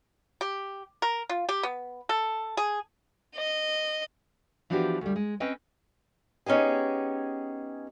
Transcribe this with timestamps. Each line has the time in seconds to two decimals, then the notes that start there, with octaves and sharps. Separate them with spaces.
0.41 G4
1.02 A#4
1.29 F4
1.49 G4
1.63 B3
2.09 A4
2.57 G#4
3.36 D#5
4.70 E3 F3 B3 D4 F#4 G4
5.01 D2 G3
5.16 G#3
5.40 C4 C#4 B4 D#5 G5
6.46 B3 C#4 D#4 G4 G#4